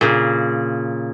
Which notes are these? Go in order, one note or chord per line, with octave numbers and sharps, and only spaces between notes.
A#2 C#3